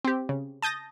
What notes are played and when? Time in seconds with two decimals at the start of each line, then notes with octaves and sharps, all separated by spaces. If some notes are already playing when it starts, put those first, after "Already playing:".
0.04 C4 G4
0.29 C#3
0.62 A5 D#6 G6 A6 A#6